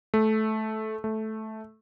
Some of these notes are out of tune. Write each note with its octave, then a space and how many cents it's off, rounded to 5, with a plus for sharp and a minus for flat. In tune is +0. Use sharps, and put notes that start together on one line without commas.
A3 -15
A3 -10